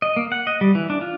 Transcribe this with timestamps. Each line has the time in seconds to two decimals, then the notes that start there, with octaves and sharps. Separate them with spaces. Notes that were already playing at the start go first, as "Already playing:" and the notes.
0.02 D#5
0.16 A#3
0.32 F#5
0.47 D#5
0.61 G3
0.75 E3
0.90 D4
1.01 F4